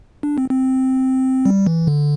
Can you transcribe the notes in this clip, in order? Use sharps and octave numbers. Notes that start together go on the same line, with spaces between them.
D4
C4
C4
G3
E3
D3